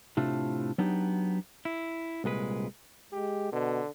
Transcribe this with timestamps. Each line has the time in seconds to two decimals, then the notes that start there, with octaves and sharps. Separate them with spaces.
0.17 A2 C3 A3 D4 F4
0.78 F#3 B3 D4 D#4 G4
1.65 E4
2.24 C2 A#2 G#3 B4
3.13 G#3 G4
3.52 B2 D3